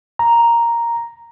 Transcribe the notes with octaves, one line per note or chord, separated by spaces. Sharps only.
A#5